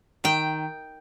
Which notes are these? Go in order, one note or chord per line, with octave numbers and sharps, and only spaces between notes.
D#3 G5